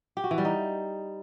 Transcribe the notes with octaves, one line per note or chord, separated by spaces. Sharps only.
G4
F#4
E3
G3
D#4